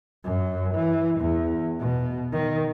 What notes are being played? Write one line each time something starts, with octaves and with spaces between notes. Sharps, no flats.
F#2
E3
E2
B2
D#3